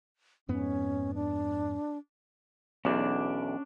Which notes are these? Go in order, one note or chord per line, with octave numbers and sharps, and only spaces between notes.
F2 G#2 B3 C#4
D4
B1 E2 C#4 D4 D5